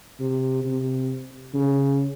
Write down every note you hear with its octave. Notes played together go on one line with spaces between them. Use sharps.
C3
C3
C#3